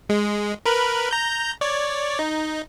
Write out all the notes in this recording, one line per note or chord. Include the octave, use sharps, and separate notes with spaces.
G#3
A#4 B4 B5
A#5 G6
C#5 D5
D#4